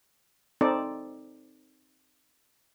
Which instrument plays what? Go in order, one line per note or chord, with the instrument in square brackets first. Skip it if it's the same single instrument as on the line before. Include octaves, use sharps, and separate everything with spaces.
[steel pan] C4 D#4 A4 D5